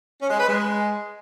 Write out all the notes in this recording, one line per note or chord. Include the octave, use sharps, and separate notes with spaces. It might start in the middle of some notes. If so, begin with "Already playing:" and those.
C#4
G#3
B4
G#3